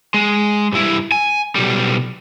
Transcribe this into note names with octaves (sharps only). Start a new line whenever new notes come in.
G#3
G2 E4
G#5
B1 G3